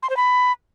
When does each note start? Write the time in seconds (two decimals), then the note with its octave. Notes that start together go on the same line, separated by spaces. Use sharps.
0.03 C6
0.10 C5
0.17 B5